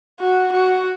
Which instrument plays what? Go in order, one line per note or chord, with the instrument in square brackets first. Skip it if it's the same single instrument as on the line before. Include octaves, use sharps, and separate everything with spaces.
[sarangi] F#4
F#4